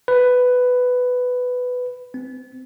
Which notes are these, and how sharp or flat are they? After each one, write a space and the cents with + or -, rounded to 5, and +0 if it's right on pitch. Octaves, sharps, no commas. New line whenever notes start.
B4 +10
C4 -25